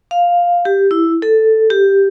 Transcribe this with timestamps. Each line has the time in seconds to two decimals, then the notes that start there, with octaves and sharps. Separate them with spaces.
0.11 F5
0.65 G4
0.91 E4
1.22 A4
1.70 G4